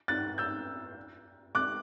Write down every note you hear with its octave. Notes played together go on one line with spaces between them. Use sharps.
F#6 A6
E6 G6
D6 F#6